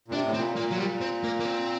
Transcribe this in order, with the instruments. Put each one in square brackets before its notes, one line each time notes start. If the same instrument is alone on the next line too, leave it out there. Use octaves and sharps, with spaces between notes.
[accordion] A#2
[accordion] C3 [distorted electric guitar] D4
[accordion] A2
[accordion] A#2 [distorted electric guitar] C4
[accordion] A#2 [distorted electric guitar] A#3
[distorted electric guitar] F#3
[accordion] A#2 [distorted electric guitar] G3
[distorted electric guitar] C4
A#3
A#3
C4